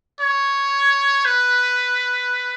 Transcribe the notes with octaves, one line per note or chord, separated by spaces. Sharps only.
C#5
B4